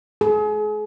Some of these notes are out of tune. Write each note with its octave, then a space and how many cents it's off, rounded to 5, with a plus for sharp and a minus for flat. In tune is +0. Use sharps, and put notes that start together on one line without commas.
G#4 +35